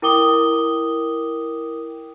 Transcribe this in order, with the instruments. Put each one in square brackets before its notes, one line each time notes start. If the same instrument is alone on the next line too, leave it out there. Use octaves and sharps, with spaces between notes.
[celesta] E4 A#4 G5 D6 D#6 G7